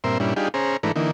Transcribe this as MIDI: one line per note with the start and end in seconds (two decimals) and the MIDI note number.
0.04 0.18 43
0.04 0.18 46
0.04 0.18 60
0.04 0.18 70
0.04 0.18 76
0.04 0.18 84
0.20 0.34 43
0.20 0.34 46
0.20 0.34 55
0.20 0.34 61
0.20 0.34 62
0.20 0.34 64
0.36 0.48 55
0.36 0.48 62
0.36 0.48 63
0.36 0.48 65
0.36 0.48 67
0.36 0.48 68
0.54 0.77 61
0.54 0.77 68
0.54 0.77 72
0.54 0.77 82
0.83 0.92 44
0.83 0.92 52
0.83 0.92 57
0.83 0.92 62
0.83 0.92 71
0.83 0.92 82
0.96 1.11 50
0.96 1.11 52
0.96 1.11 58
0.96 1.11 63